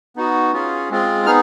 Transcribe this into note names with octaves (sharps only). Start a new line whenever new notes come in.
B3 D#4 F#4
C#4 F4 G#4
G#3 C4 F4 G#4
B3 D#4 G#4 F6